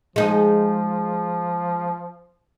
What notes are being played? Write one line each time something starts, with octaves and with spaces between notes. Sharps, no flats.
F3 G#3 D#4